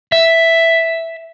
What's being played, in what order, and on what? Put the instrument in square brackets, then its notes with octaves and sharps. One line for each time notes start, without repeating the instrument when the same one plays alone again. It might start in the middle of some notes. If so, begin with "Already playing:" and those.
[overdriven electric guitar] E5